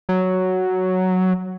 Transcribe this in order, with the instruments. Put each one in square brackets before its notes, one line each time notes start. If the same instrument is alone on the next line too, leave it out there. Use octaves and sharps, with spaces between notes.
[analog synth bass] F#3